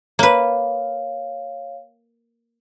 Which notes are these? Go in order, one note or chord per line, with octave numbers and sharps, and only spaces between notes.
A#3 B4 C#5 F5